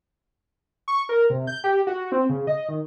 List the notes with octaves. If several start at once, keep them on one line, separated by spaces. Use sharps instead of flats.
C#6
A#4
C3
G6
G4
F#4
C4
C#3
D#5
D#3